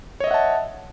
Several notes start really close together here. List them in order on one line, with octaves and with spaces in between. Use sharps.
C#5 D#5 E5 F#5 A5